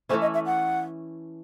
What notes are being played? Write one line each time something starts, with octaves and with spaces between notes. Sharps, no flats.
E3 A3 C#4 E4 C5
D#5
E5
F#5